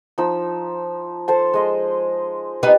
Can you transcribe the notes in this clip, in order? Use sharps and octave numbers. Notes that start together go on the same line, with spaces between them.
F3 D#4 E6
A4 C5 A5
G#3 D#5 C6
B3 D#4 G4